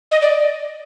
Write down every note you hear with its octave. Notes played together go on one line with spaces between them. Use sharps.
D#5
D5